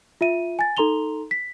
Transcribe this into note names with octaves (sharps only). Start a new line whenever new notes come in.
F4 E5 D#7
G#5 A6
D#4 A4 A#5 C6 F7 G7
B6